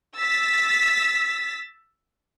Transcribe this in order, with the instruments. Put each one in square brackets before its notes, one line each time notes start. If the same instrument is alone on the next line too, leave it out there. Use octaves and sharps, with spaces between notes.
[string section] E6 A6 B6